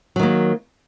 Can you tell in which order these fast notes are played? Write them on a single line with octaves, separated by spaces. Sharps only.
F#3 D#3 A#3